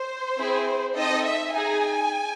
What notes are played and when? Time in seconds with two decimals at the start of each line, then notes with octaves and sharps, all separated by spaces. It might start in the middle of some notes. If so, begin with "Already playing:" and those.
Already playing: C5
0.37 C4 E4 G#4
0.95 C4 D#4 A4 D#5
1.24 E5
1.53 D#4 G#4 G#5